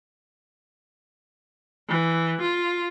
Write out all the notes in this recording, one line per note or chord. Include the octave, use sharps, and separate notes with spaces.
E3
F4